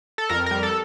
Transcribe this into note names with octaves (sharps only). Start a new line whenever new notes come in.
A4
F2 A#4
G3 A#4
A4